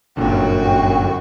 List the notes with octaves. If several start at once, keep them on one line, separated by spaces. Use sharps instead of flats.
G1 F#2 A#2 D3 F#4 G5